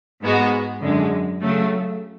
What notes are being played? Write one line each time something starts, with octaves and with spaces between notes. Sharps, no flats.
G#2 G#3 B3 F#4
F#2 D3 G#3
C#3 F#3 A3